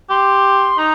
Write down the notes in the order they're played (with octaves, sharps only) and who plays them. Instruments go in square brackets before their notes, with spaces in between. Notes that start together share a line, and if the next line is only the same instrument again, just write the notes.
[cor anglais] G4 [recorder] C6
[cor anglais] D#4 [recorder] A#5